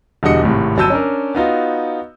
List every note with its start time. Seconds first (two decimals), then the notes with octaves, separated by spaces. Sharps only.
0.23 E1 D3 G3 F#4 D#5 C#7
0.43 G#1 A2 C3
0.77 G1 F#3 A5 E6 G6 D#7
0.90 C#4 D4 A#4
1.35 B3 D#4 F4 F#4